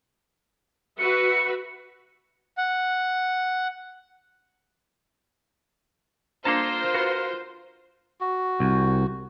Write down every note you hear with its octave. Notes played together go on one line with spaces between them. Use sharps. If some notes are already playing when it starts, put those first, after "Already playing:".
F#4 B4 E5 C#7
F#5
A#3 D4 F4 A4 A#4 C5 A5 A#5
F#4 B4 C6
F#4
C2